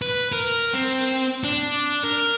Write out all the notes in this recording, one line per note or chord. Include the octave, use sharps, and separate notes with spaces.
B4
A#4
C4
D4
A#4